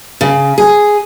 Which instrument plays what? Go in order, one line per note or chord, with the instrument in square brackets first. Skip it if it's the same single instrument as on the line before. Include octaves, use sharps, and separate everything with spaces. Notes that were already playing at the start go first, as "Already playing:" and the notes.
[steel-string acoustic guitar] C#3
G#4